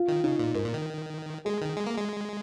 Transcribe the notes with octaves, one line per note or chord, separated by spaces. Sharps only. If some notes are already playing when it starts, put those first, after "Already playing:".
Already playing: F4
D#3
C#3 D#4
A#2
G#2 A#4
A#2
D#3
G#3 G#4
D#3
G#3
A#3
G#3